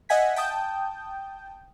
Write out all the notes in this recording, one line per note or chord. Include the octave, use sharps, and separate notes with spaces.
D#5 E5 F#5 G#5 G#6 B6
G5 A5 D#6 G6